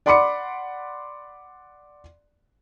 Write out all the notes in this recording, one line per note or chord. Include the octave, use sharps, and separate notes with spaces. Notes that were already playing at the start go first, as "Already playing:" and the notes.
D5 F#5 B5 C6 D6 C#7